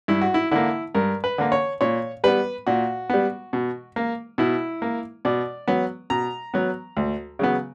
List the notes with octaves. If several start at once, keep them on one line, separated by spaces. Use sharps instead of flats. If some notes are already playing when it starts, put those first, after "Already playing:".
G2 E4
F#4
E4
D3 A#3 E4
G2 A#4
B4
D3 A#3
C#5
A#2 C#5
G3 B3 B4
A#2 F#4
G3 B3
B2
A#3
B2 E4
A#3
B2 D5
F#3 B3
B2 A#5
F#3 B3
D2
C#3 F#3 B3